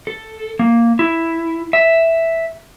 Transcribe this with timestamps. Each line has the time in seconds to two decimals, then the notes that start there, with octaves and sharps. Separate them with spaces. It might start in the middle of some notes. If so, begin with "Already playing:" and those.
0.07 A4
0.59 A#3
0.99 E4
1.73 E5